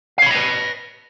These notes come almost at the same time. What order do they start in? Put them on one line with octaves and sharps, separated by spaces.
F5 C#5 B5 D#5 B4